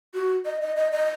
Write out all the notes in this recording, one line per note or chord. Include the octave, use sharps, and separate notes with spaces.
F#4
D#5
D#5
D#5
D#5